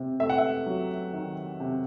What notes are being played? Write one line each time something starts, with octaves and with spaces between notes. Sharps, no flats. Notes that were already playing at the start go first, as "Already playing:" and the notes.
Already playing: C3
A3 E5
F#5
E5
F#3
D#3
C3